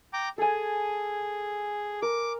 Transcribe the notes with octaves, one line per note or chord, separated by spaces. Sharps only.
G5 A#5 D6
G#4 A4 G#5
A#4 D6